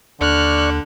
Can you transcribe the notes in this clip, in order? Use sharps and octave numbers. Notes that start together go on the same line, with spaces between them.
D#2 D3 D5 C#6 F6 F#6